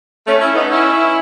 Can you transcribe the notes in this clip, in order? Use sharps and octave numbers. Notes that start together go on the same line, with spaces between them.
A3 C#4
C#4 E4
B3 D#4
C#4 E4